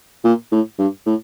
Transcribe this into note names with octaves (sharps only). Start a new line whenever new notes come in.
A#2
A2
G2
A2